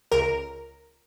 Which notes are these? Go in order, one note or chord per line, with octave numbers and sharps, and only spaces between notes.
C#2 A#4